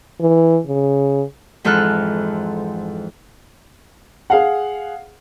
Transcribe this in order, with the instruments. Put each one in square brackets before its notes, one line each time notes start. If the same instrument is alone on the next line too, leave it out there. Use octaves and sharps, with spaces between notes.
[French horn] E3
C#3
[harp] F2 G#2 E3 A4 F6 F#6
[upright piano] G#4 F5 F#5